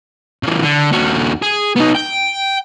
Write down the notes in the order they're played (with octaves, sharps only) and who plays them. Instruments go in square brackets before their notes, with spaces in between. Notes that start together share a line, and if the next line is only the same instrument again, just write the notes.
[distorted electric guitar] C#3 E3
D3
D#2 F#4
G#4
B3 D#4
G5